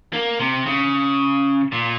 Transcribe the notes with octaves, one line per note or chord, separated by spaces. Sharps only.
A#3
C3
C#3
A#2